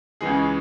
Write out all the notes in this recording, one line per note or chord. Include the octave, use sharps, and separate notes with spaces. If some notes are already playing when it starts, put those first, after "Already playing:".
C#2 C#3 E3 G#3 G#4